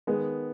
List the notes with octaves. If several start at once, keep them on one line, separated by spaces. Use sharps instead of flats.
D#3 G#3 B3